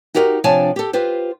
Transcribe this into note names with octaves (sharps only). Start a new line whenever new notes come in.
D#4 F#4 G4 A#4 D5 D#5
C3 F3 D4 C#5 G#5 A5
G4 A4
F4 G4 B4 C5